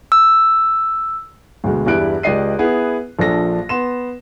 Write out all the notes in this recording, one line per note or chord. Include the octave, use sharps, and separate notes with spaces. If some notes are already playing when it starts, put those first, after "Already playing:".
E6
D2 B2 G#3
E2 G2 G3 E4 F#6 D7
C#2 G4 D5 D#5 C7 D#7
B3 E4 G#4
A#1 F3 D4 A4 A#6
B3 C6 E7